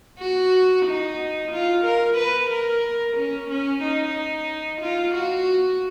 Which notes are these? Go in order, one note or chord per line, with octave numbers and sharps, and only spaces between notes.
F#4
D#4
F4
A#4
B4
A#4
C#4
C#4
D#4
F4
F#4